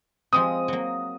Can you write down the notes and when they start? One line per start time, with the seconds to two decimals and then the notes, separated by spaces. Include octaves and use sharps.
0.33 F3 G#3 C4 D#6
0.68 F#3 A#3